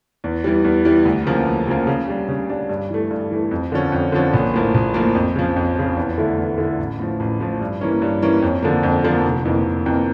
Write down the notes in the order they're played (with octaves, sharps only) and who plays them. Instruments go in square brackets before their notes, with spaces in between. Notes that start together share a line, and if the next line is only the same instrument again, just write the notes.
[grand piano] E2
E3 G3
E2
E3 G3
D2
C#3 F3 A#3
D2
C#3 F3 A#3
C#3
G3 D4
C#3
G3 D4
G2
E3 A3
G2
E3 A3
F2
D3 F3 C#4
F2
D3 F3 C#4
A#1
A2 F3 A#3
A#1
A2 F3 A#3
F2
C#3 F3
F2
C#3 F3
E2
D3 A3 E4
E2
D3 A3 E4
A1
A2 F3
A1
A2 F3
G2
E3 A#3 C#4
G2
E3 A#3 C#4
F2
D3 F3 A#3
F2
D3 F3 A#3
F1
F2 E3 A#3
F1
F2 E3 A#3